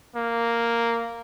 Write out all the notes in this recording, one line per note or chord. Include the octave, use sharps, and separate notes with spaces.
A#3